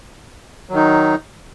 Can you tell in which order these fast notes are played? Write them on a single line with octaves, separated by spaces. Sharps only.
F#3 D#3 D#4